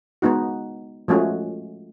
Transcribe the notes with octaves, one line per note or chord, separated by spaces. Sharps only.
G#3 B3 D#4 F#4
F3 G#3 A3 C#4 F#4